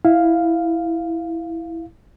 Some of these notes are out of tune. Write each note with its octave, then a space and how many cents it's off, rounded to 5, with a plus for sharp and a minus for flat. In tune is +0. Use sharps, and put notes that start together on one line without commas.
E4 +0 F5 +0